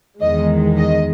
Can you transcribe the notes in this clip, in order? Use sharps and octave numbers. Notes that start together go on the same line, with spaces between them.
E2 D#3 G#3 D#5
D#5